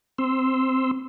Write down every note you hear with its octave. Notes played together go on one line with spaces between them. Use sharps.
C4 C6 E6